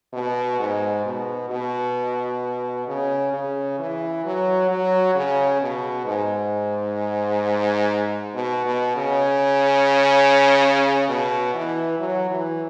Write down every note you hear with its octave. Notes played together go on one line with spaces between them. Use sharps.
B2
G#2
B2
B2
C#3
C#3
E3
F#3
F#3
C#3
B2
G#2
B2
B2
C#3
B2
E3
F#3
E3